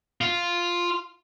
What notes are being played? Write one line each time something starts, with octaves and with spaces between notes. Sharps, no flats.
F4